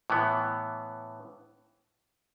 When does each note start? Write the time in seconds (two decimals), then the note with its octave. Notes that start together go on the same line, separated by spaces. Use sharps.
0.10 A2 E3 B3